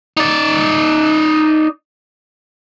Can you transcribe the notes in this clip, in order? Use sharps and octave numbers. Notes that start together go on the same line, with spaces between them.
D#4 D5